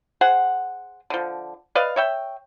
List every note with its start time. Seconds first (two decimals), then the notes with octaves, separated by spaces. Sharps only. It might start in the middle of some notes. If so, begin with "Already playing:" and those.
0.21 G#4 C5 F#5
1.10 D3 F3
1.75 B4 D5 D#5 F5
1.96 C#5 E5 G5